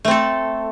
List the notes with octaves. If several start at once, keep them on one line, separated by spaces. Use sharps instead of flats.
A3 C4 A4